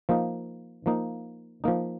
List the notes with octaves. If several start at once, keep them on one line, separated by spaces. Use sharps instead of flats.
F3 A#3 D#4
F3 A#3 D#4
F3 A#3 D#4